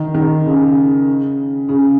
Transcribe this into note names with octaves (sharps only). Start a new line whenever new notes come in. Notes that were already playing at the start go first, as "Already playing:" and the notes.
Already playing: D#3
D#3
C#3
C#3